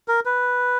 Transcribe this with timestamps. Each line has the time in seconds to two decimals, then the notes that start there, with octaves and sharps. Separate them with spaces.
0.08 A#4
0.25 B4